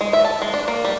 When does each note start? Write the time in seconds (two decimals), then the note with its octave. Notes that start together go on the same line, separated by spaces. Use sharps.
0.01 G#3
0.13 E5
0.25 A5
0.42 G#3
0.54 D4
0.68 A#3
0.85 G3